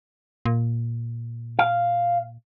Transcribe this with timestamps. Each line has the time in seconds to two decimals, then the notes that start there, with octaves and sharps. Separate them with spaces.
0.45 A#2
1.59 F5